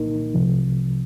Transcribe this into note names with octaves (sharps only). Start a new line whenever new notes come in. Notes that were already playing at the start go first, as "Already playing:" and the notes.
Already playing: C2 A#2 A#3 D#4 A#4
C2 C3 F3